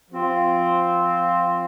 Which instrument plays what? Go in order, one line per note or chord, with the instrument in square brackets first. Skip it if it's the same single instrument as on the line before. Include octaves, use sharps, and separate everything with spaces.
[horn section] F3 C4 F4